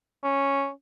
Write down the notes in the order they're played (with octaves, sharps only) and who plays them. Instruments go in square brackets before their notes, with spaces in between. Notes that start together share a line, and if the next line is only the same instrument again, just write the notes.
[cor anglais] C#4